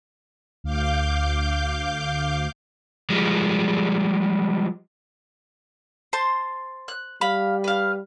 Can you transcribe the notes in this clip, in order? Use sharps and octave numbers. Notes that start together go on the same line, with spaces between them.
D2 F5 D6 G6
F3 G3 G#3
C5 A5 C6
F#6
G3 F5 B5
B4 F5